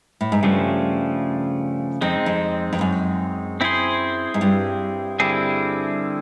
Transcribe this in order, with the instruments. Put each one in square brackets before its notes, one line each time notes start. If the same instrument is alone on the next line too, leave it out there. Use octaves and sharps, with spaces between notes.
[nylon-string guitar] A2
G#2
[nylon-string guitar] G2 [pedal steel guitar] C#3 F3 A3 C#4
[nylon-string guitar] F2 [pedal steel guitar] G#3 C4 D#4
[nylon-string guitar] F2
F2
F#2
[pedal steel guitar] C4 E4 G#4 C5
[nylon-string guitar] G#2
G2
[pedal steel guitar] D3 G3 C4 E4 G#4